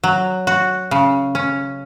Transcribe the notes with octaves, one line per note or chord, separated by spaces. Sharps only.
F#3
F#4
C#3
C#4